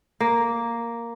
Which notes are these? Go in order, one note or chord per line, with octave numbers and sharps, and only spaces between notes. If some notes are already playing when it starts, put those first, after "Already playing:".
A#3